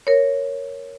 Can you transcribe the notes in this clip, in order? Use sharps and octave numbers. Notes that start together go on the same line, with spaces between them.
A#4 C#5